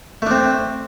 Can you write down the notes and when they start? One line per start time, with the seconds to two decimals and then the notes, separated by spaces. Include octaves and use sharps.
0.22 A3
0.27 D4
0.31 C4